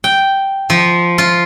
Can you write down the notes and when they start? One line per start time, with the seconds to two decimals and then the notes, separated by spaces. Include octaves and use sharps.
0.04 G5
0.70 F3
1.18 F4